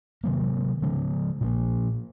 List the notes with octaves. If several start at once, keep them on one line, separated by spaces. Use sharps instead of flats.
C3 D#3 F#3 A#3
C#3 F3 G#3 C#4
A#2 F3 A#3